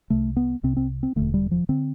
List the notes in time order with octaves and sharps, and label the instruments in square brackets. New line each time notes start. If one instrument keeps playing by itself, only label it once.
[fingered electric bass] C2 C3 A3
B3
C2 C3 C4
C4
C4
E1 E2 D3 A3
G3
F3
D3 C4